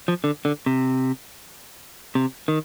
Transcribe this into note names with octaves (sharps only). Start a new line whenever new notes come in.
F3
D3
D3
C3
C3
D#3